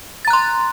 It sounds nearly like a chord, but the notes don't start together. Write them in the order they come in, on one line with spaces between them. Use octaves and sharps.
A6 A#5 F#6 C6